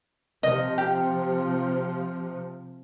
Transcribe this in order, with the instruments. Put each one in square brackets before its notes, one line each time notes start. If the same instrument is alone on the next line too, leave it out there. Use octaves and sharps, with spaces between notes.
[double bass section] C3 F3 [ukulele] D#5
[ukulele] G4